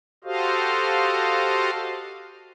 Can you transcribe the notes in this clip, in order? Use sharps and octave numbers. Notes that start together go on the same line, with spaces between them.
F#4 G4 A4 C5 D#5 F5